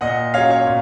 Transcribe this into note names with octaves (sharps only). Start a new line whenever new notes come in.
A#2 D#5 F#5
F#3 C#4 C#5 F5
C#5
A#2